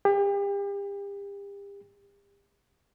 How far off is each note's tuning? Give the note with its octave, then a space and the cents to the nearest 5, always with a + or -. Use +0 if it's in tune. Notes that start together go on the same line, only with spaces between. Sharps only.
G4 +35